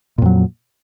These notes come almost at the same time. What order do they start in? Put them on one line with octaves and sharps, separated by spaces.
A#2 F2 F#3